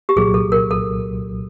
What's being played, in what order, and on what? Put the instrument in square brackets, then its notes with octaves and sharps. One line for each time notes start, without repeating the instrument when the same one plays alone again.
[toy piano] G4
[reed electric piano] C2 A#2 F#3 [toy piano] G#4
[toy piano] A4
A#4
A4